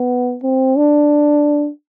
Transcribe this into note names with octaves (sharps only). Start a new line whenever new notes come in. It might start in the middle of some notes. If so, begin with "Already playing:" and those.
Already playing: B3
C4
D4